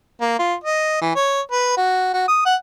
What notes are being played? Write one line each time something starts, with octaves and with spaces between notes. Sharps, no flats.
A#3
F4
D#5
E3
C#5
B4
F#4
F#4
D#6
F#5